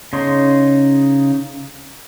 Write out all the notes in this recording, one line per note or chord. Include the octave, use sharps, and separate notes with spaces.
C#3 D#4 C6